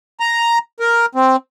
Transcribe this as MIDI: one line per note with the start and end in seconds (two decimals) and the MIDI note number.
0.20 0.58 82
0.80 1.06 70
1.15 1.36 60